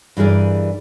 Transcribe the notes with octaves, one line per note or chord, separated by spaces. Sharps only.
G2 E3 G#4 A#4 D5